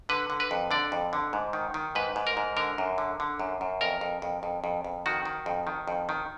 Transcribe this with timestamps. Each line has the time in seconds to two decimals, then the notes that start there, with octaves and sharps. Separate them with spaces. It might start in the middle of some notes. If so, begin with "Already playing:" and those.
0.09 D3 B4
0.30 D3
0.40 B4
0.51 F2
0.71 D3 D5
0.92 F2
1.13 D3
1.33 G#2
1.53 D#3
1.74 D#3
1.95 G#2 B4
2.16 G#2
2.27 A#4
2.37 G#2
2.57 D3 A#4
2.78 F#2
2.98 D3
3.20 D3
3.40 F#2
3.61 F#2
3.81 F2 A#4
4.01 F2
4.22 F2
4.43 F2
4.64 F2
4.84 F2
5.06 D#3 F#4
5.25 D#3
5.46 F2
5.67 D#3
5.88 F2
6.09 D#3